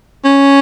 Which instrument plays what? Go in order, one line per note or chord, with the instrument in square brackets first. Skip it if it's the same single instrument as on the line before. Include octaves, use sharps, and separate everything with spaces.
[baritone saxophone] C#4